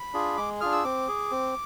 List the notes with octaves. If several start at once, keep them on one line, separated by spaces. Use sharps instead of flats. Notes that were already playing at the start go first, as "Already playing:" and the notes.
Already playing: B5
D4 F4 G#4
G#3 D6
D4 F4 G#4 F6
E6
C4 D6
G#4
C4